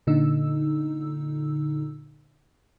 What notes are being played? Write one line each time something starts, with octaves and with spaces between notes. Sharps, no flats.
A#2 D3 D#4 E6